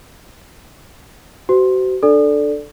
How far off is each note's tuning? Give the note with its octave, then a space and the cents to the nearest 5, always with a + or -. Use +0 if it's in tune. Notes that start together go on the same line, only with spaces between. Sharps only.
F#4 +35 C5 -40
D4 +15 A4 +0 D5 +0